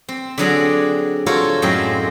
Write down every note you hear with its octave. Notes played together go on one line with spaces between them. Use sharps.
C4
D3 F#3 G#4 D5
F4 F#4 A4 A#4 C5 C#5
F#2 A2 G#3 C4 A#4 G5